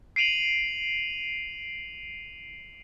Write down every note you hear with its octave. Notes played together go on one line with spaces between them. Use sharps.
C7 D7 D#7 F7 F#7